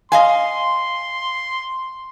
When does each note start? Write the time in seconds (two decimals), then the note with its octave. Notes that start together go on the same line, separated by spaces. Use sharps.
0.12 D#5 F5 G#5 C6